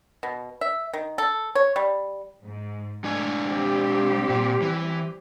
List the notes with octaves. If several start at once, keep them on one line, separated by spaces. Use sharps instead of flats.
B2
E5
D#3
A4
C#5
G3
G#2
G#3 A3 D4 G#5
G3 C4 G4
A#2
E3